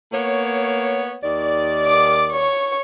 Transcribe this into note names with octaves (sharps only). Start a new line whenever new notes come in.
A#3 B3 C#5
D#2 D#3 D5
D6
C#5 C#6